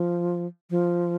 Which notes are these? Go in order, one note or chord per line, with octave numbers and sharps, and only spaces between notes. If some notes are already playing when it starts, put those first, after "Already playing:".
Already playing: F3
F3